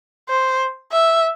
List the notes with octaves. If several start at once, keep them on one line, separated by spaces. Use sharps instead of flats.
C5
E5